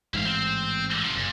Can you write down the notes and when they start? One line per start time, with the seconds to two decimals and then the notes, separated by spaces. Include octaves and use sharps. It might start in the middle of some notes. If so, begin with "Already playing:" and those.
0.14 A1 G#2 E4 F5
0.25 C4
1.04 C3 F3
1.16 F#1 A#2